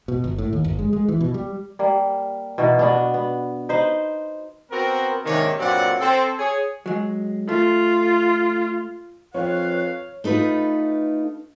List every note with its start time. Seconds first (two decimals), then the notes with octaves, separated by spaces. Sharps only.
0.08 B2
0.24 G1
0.38 A2
0.53 D#2
0.64 G1
0.79 G#3
0.93 G#3
1.09 E3
1.21 B2
1.34 G3
1.79 G3 A#3
2.58 B2 E3 F#4 A#4
2.79 B3 D4 F#4
3.14 B3
3.69 D#4 B4 C5
4.71 B3 C4 F#4 A#4
5.25 G#2 C3 D#3 A#3 D4 C#5
5.59 G2 A#2 F#3 C4 D5 F#5
6.01 C4 A4
6.38 G#4 C#5
6.86 F#3 G#3
7.49 A3 F4
9.34 F2 B4 C#5 F5
10.24 A3 D#4 F4 B4